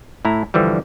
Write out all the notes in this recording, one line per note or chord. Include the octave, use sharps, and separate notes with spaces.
A2 E4 A#5
G2 D3 E3 F3 G3